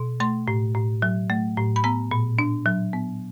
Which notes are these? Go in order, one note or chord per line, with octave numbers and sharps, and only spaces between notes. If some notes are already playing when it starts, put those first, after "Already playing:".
Already playing: B2
A3 C6
A2
A2
F#3
A3
A2
B5
B3 A#5
A#2
D4
F#3
B3